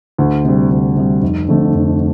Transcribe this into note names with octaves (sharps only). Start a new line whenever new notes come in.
D2
C3 G3
D2
C3 G3
F1
F2 D3 A3
F1